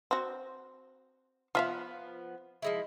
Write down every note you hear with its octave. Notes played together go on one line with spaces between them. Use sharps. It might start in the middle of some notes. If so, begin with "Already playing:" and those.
C4 F#4
F3 B3 F4 E5 F5
F3 G#3 E4